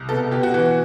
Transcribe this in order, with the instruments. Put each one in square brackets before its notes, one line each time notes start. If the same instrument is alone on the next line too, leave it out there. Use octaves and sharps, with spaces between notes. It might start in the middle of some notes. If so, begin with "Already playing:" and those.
Already playing: [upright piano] C2
B2 A4
B2 G4
F#4
E3 F#4